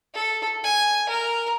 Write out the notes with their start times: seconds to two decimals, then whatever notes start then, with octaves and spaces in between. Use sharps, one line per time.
0.14 A4
0.63 G#5
1.09 A#4